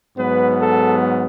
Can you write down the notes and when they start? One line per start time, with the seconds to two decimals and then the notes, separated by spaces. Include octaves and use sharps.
0.17 G#2 F#3 B3 B4
0.60 A4